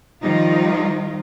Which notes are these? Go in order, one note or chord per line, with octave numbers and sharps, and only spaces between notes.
D#3 F3 G3 D#4 F4